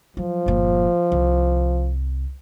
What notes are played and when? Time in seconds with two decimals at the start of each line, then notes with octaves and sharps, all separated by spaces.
0.17 F3 F#3
0.46 G1 A#2
1.12 C2